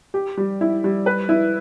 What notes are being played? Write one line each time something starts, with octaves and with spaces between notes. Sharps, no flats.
G4
G3
E4
G3
B4
E4